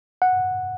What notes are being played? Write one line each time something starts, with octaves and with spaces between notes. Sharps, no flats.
F#5